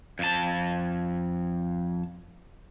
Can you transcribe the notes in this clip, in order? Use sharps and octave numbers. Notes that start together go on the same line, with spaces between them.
F2 A5